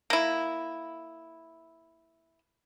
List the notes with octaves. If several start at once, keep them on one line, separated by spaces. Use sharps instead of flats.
A#3 E4